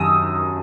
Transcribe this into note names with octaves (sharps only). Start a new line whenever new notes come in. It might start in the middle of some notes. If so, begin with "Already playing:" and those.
Already playing: F#2 D#3 D#6 E6